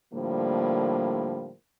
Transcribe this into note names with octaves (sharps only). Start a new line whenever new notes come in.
A2 D3 F3 G3 A#3